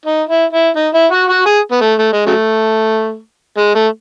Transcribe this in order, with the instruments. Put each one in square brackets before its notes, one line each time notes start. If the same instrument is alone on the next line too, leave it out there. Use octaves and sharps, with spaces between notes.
[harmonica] D#4
E4
E4
D#4
E4
F#4
F#4
G#4
B3
A3
A3
G#3
C#3 F#3 A3
G#3
A3